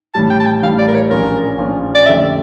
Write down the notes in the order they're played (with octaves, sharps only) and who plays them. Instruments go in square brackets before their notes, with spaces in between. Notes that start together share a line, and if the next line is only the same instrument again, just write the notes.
[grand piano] A1 A2 G3 [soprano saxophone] A5
[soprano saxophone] G5
A5
G5
[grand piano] A1 A2 G3 [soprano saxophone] F5
[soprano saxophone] D5
A#4
C#5
[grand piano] A#1 A#2 F3 C#4 F4 [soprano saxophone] A#4
[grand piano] A#1 A#2 F3 C#4 F4
[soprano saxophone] D5
[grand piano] F2 D3 A3 C#4 G4 [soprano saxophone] E5